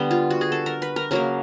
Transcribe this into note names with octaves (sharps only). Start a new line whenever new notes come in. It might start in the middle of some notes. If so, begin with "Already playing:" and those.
Already playing: D3 G3 B3
F4
F#4
G#4
A4
A#4
B4
A#4
C#3 F#3 A#3 A#4